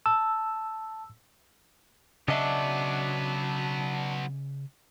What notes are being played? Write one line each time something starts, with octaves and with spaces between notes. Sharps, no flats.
A5 E6
C#3 F#3 B3 D4 D#5 E5